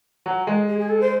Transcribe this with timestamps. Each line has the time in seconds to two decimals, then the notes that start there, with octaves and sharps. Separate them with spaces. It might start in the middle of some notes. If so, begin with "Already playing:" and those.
0.26 F#3
0.47 G#3
0.69 G#4
0.79 G#4
0.89 A4
1.01 C5